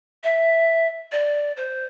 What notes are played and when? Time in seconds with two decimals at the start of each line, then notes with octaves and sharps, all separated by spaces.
0.24 E5
1.12 D5
1.57 C5